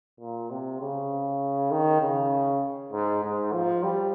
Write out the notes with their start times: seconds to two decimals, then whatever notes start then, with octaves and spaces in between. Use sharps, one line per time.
0.20 A#2
0.50 C3
0.81 C#3
1.71 D#3
2.01 C#3
2.92 G#2
3.23 G#2
3.53 F3
3.83 G3